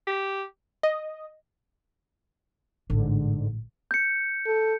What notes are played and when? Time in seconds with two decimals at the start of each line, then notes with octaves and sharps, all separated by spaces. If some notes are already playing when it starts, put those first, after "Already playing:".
0.07 G4
0.83 D#5
2.90 A1 G#2 D3
3.91 G6 C#7
4.46 A4